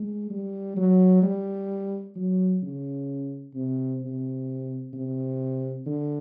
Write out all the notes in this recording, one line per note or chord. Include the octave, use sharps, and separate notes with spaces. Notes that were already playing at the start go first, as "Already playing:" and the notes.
Already playing: G#3
G3
F#3
G3
F#3
C#3
C3
C3
C3
D3